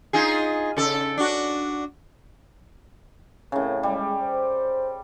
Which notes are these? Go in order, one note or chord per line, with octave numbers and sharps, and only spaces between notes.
D#4 F4 G#4
C#3 A4
D4 F#4
A2 C#3 C4 C#4 A#4
G3 G#3
C5